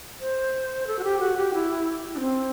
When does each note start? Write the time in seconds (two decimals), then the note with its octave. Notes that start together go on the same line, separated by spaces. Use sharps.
0.20 C5
0.87 A4
0.99 F#4
1.04 G4
1.20 F#4
1.37 G4
1.54 E4
2.15 D4
2.20 C4